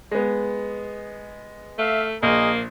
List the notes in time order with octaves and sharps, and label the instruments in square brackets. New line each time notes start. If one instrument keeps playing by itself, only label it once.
[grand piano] G#3 B3
[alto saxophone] A3 [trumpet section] E5 F5
[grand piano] A#1 [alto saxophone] A#3 [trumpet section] G#4 A#4 D#5